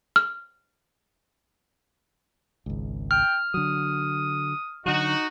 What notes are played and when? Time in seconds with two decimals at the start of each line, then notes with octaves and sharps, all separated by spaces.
0.16 F6
2.66 G#1 C#2
3.11 G5 F6
3.54 D3 F#3 D#6
4.86 D3 F#3 D#4 F#4